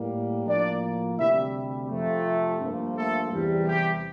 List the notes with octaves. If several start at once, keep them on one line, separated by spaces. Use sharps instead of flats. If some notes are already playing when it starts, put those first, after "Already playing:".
Already playing: A2 G3 A#3
A2 F3 A#3 D4 D5
D2 C3 G3 E4 E5
F2 C3 F3 A3
G2 F3 A#3
A3 A4
E2 C3 G3
G3 G4